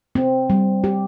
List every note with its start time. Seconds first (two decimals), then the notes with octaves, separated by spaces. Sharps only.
0.15 C4
0.50 G3
0.84 G4